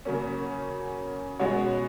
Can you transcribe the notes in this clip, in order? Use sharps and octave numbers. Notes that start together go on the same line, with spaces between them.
C#3 F#3 A#3 C#4
B2 G#3 C#4 F#4 C#5